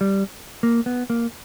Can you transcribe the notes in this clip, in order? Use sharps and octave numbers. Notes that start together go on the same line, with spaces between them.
G3
A#3
B3
A#3